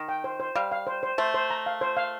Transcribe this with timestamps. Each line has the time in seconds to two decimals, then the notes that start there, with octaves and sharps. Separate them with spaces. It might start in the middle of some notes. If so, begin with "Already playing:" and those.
Already playing: D#3
0.09 G5
0.24 C5
0.40 C5
0.55 G3 F5
0.72 F5
0.87 C5
1.03 C5
1.18 A3 C5
1.34 C5
1.50 A#5
1.66 F5
1.81 C5
1.97 F5